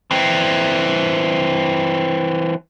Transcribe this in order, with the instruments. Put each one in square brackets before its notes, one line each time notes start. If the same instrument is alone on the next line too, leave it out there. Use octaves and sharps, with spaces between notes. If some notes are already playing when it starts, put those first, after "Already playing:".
[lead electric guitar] E3 C4